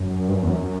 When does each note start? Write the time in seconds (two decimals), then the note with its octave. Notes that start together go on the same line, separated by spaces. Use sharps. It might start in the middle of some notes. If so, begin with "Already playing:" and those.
Already playing: F#2
0.28 G2
0.35 F#2
0.42 E2
0.50 F#2